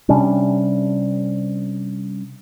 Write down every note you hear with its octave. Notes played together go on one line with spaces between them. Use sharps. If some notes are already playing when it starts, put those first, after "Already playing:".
C3 G3 C#4 D4